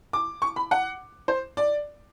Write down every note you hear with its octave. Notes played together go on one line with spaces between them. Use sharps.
D6
C#6
B5
F#5
C5
D5